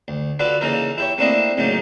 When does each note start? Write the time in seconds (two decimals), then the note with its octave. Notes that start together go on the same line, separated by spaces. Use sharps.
0.08 D2
0.39 F4 F#4 A4 B4 D5
0.61 C#3 E3 A#3 D#4 A4 A#4
0.98 E4 G4 C#5
1.18 A3 A#3 C4 D4 E4 D#5
1.57 A2 C#3 F#3 A3 A#3 D#4